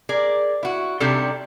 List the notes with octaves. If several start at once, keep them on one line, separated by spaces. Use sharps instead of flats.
G#4 A#4 D5
E4 F#4
C3 G3 D4 D#4 G4 A4